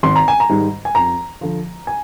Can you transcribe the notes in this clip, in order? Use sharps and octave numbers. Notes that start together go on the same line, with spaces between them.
G#1 C6
A#5
G#5
A#5
G#2 D#3 G3
G#5
F2 A#5
D3 F3
G#5